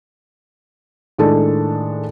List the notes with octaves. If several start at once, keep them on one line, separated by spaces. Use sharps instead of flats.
A2 D#3 G#3 D4 A4